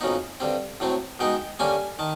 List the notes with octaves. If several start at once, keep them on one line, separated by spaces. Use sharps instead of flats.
F2 C#3 F#3 B3 D#4
G2 D3 G3 C4
A2 F#3 A3 C4
B2 G#3 B3 D#4 G5
D3 G3 A#3 C#4 G#5
D#3 A5